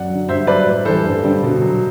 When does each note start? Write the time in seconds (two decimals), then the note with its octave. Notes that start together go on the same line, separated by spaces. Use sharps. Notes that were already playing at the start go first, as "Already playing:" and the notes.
Already playing: F#2 D5 F#5
0.10 D3 F#3
0.28 G2 C5 E5
0.47 F#3 B4 D5
0.66 A2
0.85 E3 G3 A4 C5
1.04 G2
1.24 D3 G3
1.43 B2
1.61 F#3